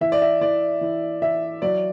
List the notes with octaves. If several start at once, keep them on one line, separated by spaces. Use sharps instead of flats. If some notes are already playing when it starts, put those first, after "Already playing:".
E3 E5
D5
E5
E3 D5
E3
E3 E5
F#3 D5